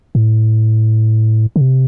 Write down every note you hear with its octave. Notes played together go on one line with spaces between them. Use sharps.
A2
D3
C3